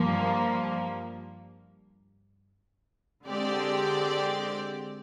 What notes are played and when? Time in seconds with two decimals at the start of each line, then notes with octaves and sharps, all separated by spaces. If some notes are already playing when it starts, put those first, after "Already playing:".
Already playing: G2 F3 A#3
3.27 D3 G#3 C4 G4 D5